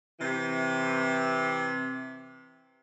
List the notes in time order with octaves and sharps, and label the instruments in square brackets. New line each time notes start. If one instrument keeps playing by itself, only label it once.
[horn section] C3 E3